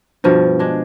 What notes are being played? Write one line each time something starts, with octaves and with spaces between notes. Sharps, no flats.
G2 B2 F3
G#3 D4